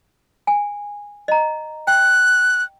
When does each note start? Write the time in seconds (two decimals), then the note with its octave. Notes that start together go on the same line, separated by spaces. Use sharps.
0.47 G#5
1.28 D#5 A#5
1.87 G5 F#6